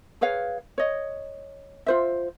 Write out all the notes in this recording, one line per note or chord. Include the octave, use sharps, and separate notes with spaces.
G#4 B4 C#5 F5
C#5 D#5
F4 C5 E5